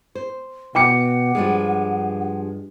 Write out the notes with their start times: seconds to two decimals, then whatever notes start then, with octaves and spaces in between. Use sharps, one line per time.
0.15 C5
0.75 B2 F#5 G5 D6 C#7
1.35 G2 F3 G3 G#3